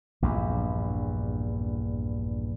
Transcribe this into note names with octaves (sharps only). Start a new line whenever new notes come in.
A#1 E2 G2